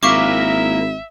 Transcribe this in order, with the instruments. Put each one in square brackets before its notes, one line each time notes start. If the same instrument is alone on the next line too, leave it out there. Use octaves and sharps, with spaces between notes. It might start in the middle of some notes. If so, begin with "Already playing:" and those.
[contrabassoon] G#1 [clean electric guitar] A#3 E4 A#4 [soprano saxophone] E5 [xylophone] F5 C#6 D6